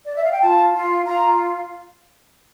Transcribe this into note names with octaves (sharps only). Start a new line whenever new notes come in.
D5
E5
F5
G5
F4 A5
F4
F4 A#5